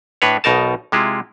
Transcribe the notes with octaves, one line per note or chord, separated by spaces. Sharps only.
A2 D4 B4 C#5
B1 B2 D#4 A#4 A5
C3 G#3 E4 F4